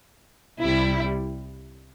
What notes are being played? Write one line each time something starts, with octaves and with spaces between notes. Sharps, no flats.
C2 C3 G3 E4